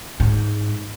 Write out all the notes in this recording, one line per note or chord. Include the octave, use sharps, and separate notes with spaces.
G#2